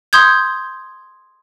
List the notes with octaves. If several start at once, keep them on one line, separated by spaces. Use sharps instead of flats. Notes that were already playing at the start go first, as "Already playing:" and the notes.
C6 D#6 G6 G#6